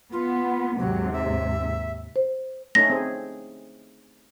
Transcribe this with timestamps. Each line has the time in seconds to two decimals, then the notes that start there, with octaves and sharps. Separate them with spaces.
0.12 B3 F4
0.78 D#2 G#2 C3 F#3
1.13 E5
2.16 C5
2.75 A3 C#4 D#4 A#6
2.90 C4 G#4